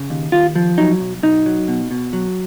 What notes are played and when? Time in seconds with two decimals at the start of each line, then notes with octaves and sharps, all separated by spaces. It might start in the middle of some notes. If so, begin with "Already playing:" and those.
Already playing: C#3
0.10 D#2
0.32 D#2 F4
0.56 F3
0.78 F#3 D#4
1.00 B1
1.23 B1 D#4
1.46 F#3
1.68 B2
1.91 B2
2.13 F#3